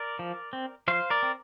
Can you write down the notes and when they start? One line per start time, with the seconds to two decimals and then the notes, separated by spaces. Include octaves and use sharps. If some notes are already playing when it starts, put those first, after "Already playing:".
Already playing: A#4 D5
0.19 F3
0.53 C4
0.88 F3 C5 F5
1.10 A#4 D5
1.23 C4